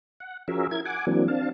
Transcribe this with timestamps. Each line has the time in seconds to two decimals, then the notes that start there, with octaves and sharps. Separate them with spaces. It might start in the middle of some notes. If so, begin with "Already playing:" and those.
0.20 F#5
0.48 F3 C#4 F#4 G#4 A#4 E5
0.71 E4 A#4 G#6
0.85 F#5 G#5 D6
1.07 E3 F#3 A#3 C4 D4
1.28 C4 D4 F5 A5